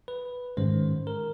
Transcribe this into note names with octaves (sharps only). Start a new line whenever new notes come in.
B4
G#2 D#3 G#3 C#4 C5
A#4